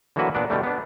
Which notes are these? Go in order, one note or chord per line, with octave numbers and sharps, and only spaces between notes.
D3 E3 F#3 A#3 F#4 B4
A#2 B3 D4 D5
B2 D3 G3 A3
B3 D4